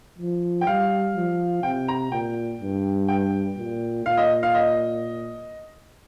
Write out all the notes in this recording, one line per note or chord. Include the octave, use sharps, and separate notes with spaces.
F3
G5
G3 F5
F3
C3 G5
A#5
A#2 G5
G2
G5
A#2
A#2 F5
D#5
F5
D#5